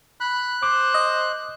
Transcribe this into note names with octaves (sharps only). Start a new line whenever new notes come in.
B5 F#6
C5 D6
D#5